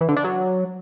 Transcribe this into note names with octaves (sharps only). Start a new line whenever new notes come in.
E3
D3
D4
F#3